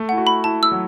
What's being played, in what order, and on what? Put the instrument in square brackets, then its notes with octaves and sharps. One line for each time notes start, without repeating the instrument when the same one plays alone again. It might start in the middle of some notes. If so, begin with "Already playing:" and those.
Already playing: [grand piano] A3
[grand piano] E4 [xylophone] F#5
[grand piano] F#4
[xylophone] B5
[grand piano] E4 [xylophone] A5
[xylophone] E6
[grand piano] F#3